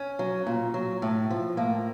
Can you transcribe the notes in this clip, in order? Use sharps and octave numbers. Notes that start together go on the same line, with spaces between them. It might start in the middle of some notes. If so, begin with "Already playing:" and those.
Already playing: C#4
F#3
A#2
F#3
A2
F3
A2 A#3